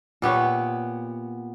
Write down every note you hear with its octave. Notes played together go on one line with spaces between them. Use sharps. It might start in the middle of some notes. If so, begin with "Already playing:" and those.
A#2 B3 G4 C#5